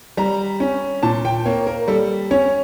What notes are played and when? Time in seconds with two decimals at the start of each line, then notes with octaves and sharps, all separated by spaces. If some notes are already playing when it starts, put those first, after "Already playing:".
0.17 G3 A#5
0.60 C#4
1.03 A#2 A5
1.25 G5
1.45 A#3 C#5
1.67 A#4
1.88 G3 A4
2.31 C#4 C#5